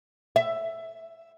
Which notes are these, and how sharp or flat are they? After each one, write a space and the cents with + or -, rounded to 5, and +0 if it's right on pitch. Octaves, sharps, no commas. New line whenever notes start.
E5 +5